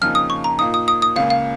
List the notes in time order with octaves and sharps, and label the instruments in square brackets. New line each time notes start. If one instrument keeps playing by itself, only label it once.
[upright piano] F2 C#3 A#3 D#4 [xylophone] F6
[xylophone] D#6
C#6
A#5
[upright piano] A#2 A#3 D#4 [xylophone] D#6
[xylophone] D#6
D#6
D#6
[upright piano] C#2 C#3 A#3 [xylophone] F5
[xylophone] F5